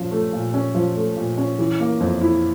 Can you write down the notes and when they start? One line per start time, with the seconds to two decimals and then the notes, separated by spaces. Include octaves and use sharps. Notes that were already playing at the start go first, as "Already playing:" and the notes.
Already playing: A#2 F3 C#4
0.12 A3
0.33 A#2
0.54 C#4
0.75 F3
0.95 A3
1.16 A#2
1.38 C#4
1.59 E3
1.80 A#3
2.00 F2
2.22 E4